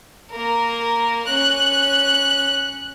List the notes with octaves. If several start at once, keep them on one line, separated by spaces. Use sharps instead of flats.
A#3 A#4
C#4 F#6